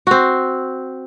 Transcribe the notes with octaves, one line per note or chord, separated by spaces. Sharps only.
C4 F#4